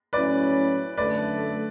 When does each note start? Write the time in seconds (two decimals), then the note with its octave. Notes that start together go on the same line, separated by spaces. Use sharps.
0.13 A2 F#3 C#4 E4 B4 D5
0.98 F#2 D3 A3 B4 D5